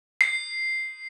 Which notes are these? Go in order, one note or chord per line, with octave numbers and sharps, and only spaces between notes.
C7